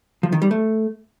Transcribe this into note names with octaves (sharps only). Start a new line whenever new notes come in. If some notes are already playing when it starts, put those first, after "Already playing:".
F3
D#3
G3
A3